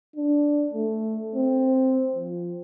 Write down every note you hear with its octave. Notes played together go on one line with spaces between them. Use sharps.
D4
A3
C4
F3